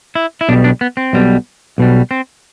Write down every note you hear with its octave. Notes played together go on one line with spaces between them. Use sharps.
E4
E4
B1 B2 G3 D4
D4
B3
C4
B1 B2 G3
B1 B2 G3
C4